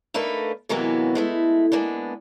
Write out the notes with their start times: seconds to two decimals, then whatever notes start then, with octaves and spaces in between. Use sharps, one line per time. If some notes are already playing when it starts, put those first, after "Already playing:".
0.14 A3 A#3 D4 D#4 B4
0.69 C3 E3 F#3 G#3 A#3 B3
1.15 G#3 A3 E4
1.72 G#3 A#3 B3 D4